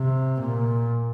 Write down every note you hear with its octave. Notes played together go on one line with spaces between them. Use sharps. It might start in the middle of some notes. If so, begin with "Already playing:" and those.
Already playing: C3
A#2